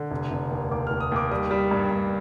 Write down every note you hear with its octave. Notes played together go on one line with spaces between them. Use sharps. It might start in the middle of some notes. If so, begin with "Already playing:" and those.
Already playing: D3
F1
F1
D#2
D#2 D6
D#2 F6
D#6
D#2 D6
G3 D#6
G3
G2
G2